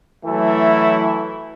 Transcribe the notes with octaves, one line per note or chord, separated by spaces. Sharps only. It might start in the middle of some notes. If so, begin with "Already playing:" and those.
E3 F#3 A3 E4